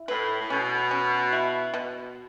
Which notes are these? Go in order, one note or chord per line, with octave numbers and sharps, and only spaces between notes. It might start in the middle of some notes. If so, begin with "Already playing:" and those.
Already playing: E4
A2 B4
A2
B2 C#4
C#4
E4
B2